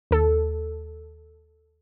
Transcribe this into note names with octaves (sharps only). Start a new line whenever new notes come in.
D#2 A4